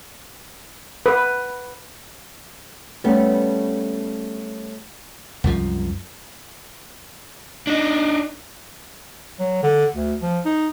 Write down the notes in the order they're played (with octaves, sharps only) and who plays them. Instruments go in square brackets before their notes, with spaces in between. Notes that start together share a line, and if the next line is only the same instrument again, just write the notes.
[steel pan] B4
[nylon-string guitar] G3 A3 B3 C#4
[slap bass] C2 F#2 F3
[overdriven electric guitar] D4 D#4
[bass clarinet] F#3
D3
D2
F3
D#4